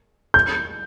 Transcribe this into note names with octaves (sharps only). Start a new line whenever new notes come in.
G6